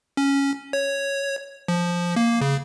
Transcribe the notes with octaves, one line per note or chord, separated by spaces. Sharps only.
C#4
C#5
F3
A#3
C#3